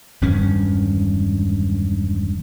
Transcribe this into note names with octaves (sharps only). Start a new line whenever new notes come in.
E1 G2 D#3 C#4